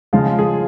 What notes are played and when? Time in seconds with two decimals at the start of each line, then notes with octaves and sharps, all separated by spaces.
0.13 C#3 F3 G#3 F4
0.39 G#4